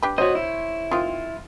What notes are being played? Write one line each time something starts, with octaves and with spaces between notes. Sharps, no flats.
D4 G4 B4
F#4 C5 C#5 D#5
E4
D#3 C4 F4